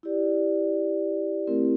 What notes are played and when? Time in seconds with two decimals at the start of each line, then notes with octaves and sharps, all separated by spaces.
0.03 E4 G4 D5
1.47 A3 C4 E4 G4 A#4